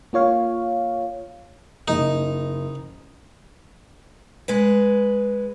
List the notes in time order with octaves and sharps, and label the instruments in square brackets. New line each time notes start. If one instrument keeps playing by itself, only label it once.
[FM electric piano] A#3 F4 C#5 F5
[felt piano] F#1 [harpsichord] D#4
[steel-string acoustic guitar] G#3 B4